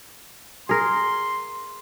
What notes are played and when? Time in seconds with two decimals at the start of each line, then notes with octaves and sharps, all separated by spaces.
0.69 G#4 A#4 C6